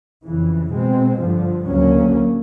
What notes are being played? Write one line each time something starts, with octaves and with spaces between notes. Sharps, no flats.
F2 C#3 E3
B2 G#3 C4
G2 D3 F3
D2 C#3 F#3 A#3 C#4